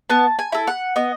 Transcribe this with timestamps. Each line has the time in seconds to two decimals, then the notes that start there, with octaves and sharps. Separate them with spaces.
0.10 B3 A5
0.39 G#5
0.52 E4 A4
0.67 F#5
0.96 B3 D#5